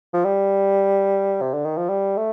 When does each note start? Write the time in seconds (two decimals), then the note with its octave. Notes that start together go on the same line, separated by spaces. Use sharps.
0.14 F3
0.25 G3
1.41 C3
1.54 D3
1.65 D#3
1.77 F3
1.89 G3
2.17 A3